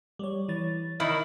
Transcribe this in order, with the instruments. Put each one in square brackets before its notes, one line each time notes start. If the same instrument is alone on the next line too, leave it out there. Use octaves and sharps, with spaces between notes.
[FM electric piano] G3 C#5
E3 C#5 A6
[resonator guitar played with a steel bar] D#3 E4 [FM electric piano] F6